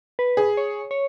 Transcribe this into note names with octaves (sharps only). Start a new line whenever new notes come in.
B4
G#4
C#5
C#5